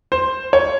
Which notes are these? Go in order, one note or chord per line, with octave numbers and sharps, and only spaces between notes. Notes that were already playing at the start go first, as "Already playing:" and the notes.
C5
C#5